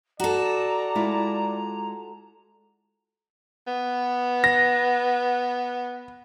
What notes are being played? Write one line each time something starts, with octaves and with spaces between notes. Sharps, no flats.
F#4 A4 D5 A#5
G#3 E4 F4
B3
A#6